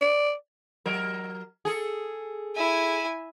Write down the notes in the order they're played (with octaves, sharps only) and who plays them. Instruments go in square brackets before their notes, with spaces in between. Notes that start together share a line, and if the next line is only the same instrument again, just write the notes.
[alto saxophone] D5
[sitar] F#3 A#4
G#4 A4
[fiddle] E4 G#5